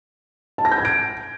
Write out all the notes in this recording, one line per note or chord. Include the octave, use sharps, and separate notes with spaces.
A5
A#6
G6
G#6
D7